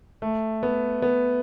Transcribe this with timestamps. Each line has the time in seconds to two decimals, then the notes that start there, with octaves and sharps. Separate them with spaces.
0.22 A3
0.63 B3
1.02 B3